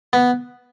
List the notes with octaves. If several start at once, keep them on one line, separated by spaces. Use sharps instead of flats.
B3